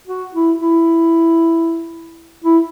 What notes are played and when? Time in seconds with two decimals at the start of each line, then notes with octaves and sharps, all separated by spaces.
0.07 F#4
0.34 E4
0.60 E4
2.44 E4